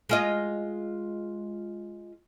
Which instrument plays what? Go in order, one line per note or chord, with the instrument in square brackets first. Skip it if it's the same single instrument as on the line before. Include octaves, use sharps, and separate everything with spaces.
[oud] G#3 F4 D#5